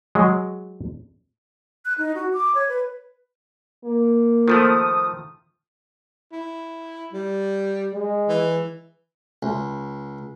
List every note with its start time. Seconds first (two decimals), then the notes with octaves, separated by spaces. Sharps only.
0.15 F#3 G#3
1.85 F#6
1.98 D#4
2.15 F#4
2.33 D6
2.55 C#5
2.69 B4
3.84 A#3
4.48 D#3 F3 A3 F4 A4 C5 D#6
6.32 E4
7.13 G3
7.93 G#3
8.29 E3
9.43 C#2